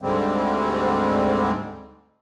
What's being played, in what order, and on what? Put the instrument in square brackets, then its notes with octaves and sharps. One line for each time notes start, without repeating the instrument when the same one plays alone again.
[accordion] D2 G#2 D3 G3 G#3 C4